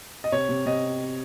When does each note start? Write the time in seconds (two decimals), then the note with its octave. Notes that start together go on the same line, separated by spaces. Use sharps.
0.24 D#5
0.32 C3 C#5
0.49 C3
0.66 C3 D#5